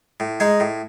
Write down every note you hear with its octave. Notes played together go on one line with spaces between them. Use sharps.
A2
G#3 D#4 G#4
A2